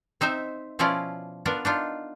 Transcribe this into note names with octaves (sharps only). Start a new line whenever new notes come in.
C4 D#4 C5 E5
B2 F3 C#4 E4 F4 D5
B3 D4 F4 A#4
D4 D#4 F4